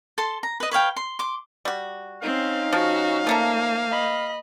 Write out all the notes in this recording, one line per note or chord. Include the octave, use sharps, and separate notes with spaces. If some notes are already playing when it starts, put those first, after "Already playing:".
A4 A5 C6
A#5
B4 D#5
B4 C#5 F5 G5
C6
C6 D6
G3 F#4
C4 C#4 D#4 F5
F3 F#4
F3 A3 A#3 A#5
D#5 B5